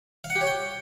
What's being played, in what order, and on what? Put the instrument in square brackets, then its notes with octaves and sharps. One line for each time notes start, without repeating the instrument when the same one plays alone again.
[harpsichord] F5
F#5
G4
C#5
G5